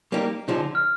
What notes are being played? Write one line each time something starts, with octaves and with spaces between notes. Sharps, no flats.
G3 A#3 D#4 G4
D3 F3 G#3 D#4
F6